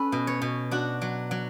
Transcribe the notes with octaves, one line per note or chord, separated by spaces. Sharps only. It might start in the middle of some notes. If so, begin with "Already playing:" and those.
Already playing: C#4 A4 B4
B2
C#5
B2
D4 F#4
F#3
F#3